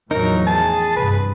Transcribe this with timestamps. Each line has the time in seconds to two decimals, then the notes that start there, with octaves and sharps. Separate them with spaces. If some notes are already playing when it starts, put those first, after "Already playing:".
0.11 E2 A2 F3 F#3 D#4 A#4
0.47 G#4 A5
0.97 C2 G2 B4